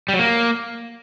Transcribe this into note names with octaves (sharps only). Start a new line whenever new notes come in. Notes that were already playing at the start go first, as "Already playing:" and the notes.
G3
F#3
A#3